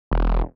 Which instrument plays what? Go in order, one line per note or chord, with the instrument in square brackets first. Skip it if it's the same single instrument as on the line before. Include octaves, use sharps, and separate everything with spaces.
[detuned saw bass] E1